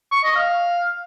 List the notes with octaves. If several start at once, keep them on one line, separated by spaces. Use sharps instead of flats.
C#6
D#5
F5